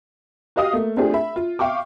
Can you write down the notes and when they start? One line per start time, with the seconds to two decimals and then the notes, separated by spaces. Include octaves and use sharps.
0.56 F#4 G4 D#5 F5 D#6
0.73 A3 A#3
0.97 A3 C4 D4 F4 G4 G#4
1.14 E5 B5
1.36 F4
1.59 E5 F5 G5 C#6 D6